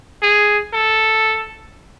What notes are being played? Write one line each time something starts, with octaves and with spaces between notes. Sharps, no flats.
G#4
A4